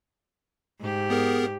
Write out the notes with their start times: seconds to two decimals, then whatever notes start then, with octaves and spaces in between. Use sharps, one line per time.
0.80 G#2 G4
1.10 B3 G#4 A#4